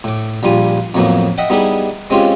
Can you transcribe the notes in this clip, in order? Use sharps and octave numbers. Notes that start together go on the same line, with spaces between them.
A2 D6
A#1 G3 F4 G#5
F2 A2 F#3 A#3 B3
D#5 E5 F#5 G5
G3 B3 D#4 E4 G4 G#4
G#3 C4 C#4 F4 G4